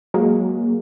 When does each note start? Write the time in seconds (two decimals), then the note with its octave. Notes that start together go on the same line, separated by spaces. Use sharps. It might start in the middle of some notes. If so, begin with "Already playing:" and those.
0.14 F#3 G#3 A#3